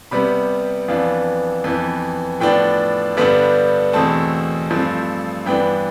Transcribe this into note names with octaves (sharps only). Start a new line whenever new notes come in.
C3 G3 B3 B5
F2 E3 B3 D4 F5
F2 E3 B3
A2 F3 B3 D4 G5
G2 D3 G3 B3 D4
E2 B2 A3 C4 A5
G2 F3 A3 C4
G2 E3 B3 D4 G5